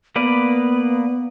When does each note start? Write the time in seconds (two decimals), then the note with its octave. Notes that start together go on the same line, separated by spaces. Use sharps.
0.16 A#3 B3 B4 D5